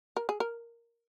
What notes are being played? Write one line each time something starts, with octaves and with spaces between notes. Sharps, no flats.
A#4
G#4
A#4